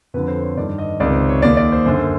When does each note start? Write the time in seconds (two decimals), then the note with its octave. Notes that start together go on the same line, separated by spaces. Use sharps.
0.14 F2 D3 B4
0.28 C5
0.42 C#5
0.57 G2 D#3 D5
0.78 D#5
1.00 C#2 C3 D#3 D5
1.14 C5
1.29 C#5
1.42 D#2 D#3 D5
1.57 D5
1.72 C5
1.85 F#2 D3 C5